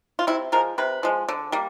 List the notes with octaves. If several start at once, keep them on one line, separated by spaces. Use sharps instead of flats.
F4
C3 E4
F3 G#3 A#4
C3 B4
F3 G#3
D3
G3 A#3